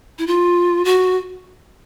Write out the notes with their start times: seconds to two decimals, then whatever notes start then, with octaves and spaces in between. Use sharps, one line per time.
0.19 E4
0.27 F4
0.85 F#4